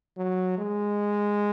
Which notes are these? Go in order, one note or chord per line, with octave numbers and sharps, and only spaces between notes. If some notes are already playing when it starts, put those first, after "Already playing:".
F#3
G#3